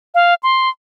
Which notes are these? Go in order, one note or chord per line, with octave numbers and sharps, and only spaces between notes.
F5
C6